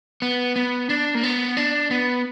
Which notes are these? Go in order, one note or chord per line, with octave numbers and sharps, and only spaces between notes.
B3
B3
D4
A#3
B3
D4
B3